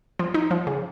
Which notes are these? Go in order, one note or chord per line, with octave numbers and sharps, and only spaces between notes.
F3
D#4
F3
C#3